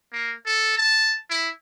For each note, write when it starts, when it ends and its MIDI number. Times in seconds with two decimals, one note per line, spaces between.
0.12 0.33 58
0.46 0.75 69
0.77 1.17 81
1.30 1.49 64